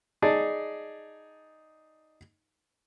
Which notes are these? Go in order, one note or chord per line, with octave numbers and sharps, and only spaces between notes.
D#4 G#4 D5 A5